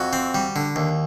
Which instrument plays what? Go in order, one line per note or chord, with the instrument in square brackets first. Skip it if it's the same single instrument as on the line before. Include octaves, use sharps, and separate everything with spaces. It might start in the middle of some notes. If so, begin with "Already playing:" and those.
Already playing: [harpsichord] F2 F#4
C4
G3
D3
D#2